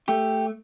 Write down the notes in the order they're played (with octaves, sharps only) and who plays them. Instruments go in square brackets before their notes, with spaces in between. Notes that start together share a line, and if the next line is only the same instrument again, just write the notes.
[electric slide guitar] A3 [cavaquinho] G4